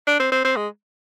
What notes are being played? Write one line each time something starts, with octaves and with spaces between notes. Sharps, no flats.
D4
C4
C4
C4
G#3